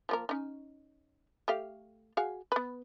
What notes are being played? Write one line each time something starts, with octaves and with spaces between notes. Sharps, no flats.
F3 A#3 A#4
C#4 D#4
A3 G4 F5
F#4 G#4 F5
B3 B4